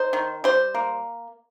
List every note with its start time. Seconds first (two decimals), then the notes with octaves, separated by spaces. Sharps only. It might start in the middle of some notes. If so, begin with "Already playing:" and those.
Already playing: D#4 C5
0.13 D#3
0.44 G3 C5
0.75 A#3